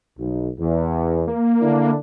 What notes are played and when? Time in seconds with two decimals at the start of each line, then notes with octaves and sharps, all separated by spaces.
0.19 B1
0.60 E2
1.28 A#3
1.61 D3 D4 E4